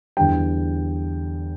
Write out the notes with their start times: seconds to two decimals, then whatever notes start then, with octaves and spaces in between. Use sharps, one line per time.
0.17 E2 D3 G3 G5